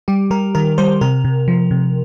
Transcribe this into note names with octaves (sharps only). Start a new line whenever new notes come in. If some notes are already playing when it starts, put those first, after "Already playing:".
G3 G4
G3 A#4
D#3 A#4
G3 C5
C3 A#4
C3
F3
C3